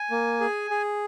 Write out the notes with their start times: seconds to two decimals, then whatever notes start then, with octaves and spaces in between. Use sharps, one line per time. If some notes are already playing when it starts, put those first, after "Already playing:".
Already playing: G#5
0.11 A#3
0.41 G#4
0.71 G#4